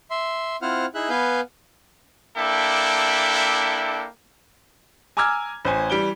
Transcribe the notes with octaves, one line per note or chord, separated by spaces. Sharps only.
E5 C6
C4 E4 F4 C5 F#5 F6
D#4 E4 G#4 E5 F#6
B3 B4 F5 G#5 G6
A#3 D4 E4 A4 E5 G5
G#5 A#5 D6 E6 F6 G#6
A1 C5 G#5
E3 G3 D7 G7